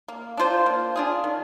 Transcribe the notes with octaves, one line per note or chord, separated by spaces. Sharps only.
A#3
D4 F4 C5
A#3
D4 F4 G#4
D#3